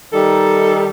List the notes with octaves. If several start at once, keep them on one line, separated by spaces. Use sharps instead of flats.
D#3 G3 D#4 A4